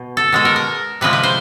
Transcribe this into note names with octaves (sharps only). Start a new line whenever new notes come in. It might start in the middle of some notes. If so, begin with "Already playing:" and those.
Already playing: B2
A4
B2 G#3 A4
A#4
A#4
C3 F3 G#3 B4
B4
C5